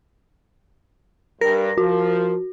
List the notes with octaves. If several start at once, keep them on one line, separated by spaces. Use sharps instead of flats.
G2 A#4 A#6
F3 F#4